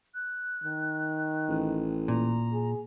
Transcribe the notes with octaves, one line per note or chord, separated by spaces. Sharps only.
F#6
D#3
A1
A#2 A#5
G#4